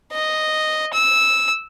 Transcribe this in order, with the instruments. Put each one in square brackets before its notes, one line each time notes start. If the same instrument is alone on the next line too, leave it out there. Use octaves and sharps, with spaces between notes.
[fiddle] D#5
E6